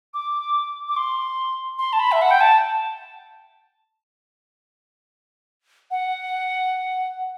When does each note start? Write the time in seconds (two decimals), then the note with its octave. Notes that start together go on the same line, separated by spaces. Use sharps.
0.14 D6
0.88 D6
0.96 C6
1.78 C6
1.93 A5
2.00 B5
2.12 E5
2.22 F#5
2.31 G5
2.40 A5
5.91 F#5